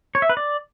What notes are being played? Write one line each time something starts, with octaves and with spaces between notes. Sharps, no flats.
C#5
E5
B4
D5